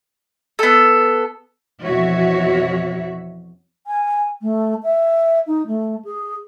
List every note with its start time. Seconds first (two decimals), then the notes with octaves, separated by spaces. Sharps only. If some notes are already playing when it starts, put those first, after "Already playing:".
0.59 B3 A4
1.83 F2 B2 E3 F#4 C#5 E5
3.87 G#5
4.42 A3
4.83 E5
5.47 D#4
5.67 A3
6.05 G#4